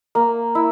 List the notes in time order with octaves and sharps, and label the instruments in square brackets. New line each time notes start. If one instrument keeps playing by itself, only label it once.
[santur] A#3
E4